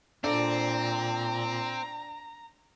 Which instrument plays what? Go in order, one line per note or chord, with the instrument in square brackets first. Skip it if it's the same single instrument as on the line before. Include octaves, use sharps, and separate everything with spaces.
[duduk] A#2 [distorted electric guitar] C4 [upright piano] D4 A4 [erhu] A#5